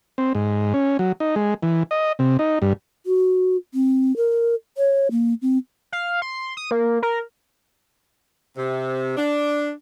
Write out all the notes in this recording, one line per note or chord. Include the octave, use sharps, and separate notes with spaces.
C4
G#2
C#4
F#3
D#4
G#3
E3
D#5
C3
D#4
G2
F#4
C4
A#4
C#5
A#3
C4
F5
C6
D#6
A#3
A#4
C3
D4